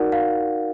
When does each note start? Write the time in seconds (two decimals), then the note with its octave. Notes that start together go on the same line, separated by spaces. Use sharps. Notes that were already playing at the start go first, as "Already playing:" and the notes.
Already playing: D#4 F#4 A#4 D5 F#5
0.12 F5